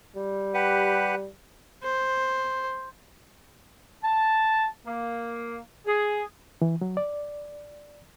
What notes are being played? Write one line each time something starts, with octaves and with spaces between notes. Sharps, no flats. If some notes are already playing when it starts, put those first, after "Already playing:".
G3
G4 B4 F#5
C5
A5
A#3
G#4
E3
F#3
D5